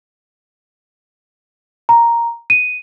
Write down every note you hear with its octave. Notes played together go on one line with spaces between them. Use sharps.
A#5
D#7